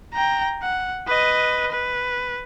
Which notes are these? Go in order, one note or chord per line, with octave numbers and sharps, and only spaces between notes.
G5 A#5
F#5
B4 D#5
B4